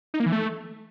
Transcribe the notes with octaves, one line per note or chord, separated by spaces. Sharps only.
D#4
A#3
E3
A3